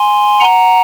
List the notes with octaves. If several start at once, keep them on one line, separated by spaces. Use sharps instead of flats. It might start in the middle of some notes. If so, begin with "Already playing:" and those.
Already playing: G#5 C6
F#5 A#5